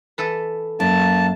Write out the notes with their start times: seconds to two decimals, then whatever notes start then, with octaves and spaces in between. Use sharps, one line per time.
0.18 E3 A4 B4
0.80 F#2 A#3 A5